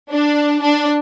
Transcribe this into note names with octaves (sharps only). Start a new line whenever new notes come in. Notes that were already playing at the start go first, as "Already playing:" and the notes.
D4
D4